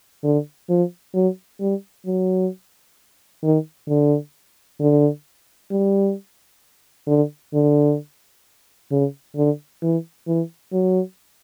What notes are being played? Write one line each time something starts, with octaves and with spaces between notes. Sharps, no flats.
D3
F3
F#3
G3
F#3
D#3
D3
D3
G3
D3
D3
C#3
D3
E3
E3
F#3